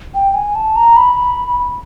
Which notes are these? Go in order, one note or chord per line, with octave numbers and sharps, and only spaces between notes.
G5
G#5
A5
A#5
B5